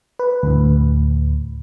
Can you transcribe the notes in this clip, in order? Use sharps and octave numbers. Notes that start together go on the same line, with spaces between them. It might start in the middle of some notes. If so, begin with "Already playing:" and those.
B4
D2 A2